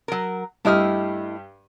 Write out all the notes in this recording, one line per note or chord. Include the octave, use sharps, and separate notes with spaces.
F#3 A#4
G2 A3 E4 G4 D#5 F6